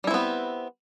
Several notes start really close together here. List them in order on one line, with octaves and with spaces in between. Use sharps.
G3 E4 C4 B3